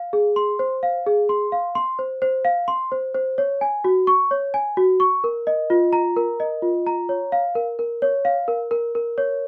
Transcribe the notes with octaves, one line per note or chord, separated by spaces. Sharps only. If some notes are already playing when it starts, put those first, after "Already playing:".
Already playing: F5
G#4
C6
C5
F5
G#4
C6
F5
C6
C5
C5
F5
C6
C5
C5
C#5
G#5
F#4
C#6
C#5
G#5
F#4
C#6
A#4
D#5
F4
A#5
A#4
D#5
F4
A#5
C#5
F5
A#4
A#4
C#5
F5
A#4
A#4
A#4
C#5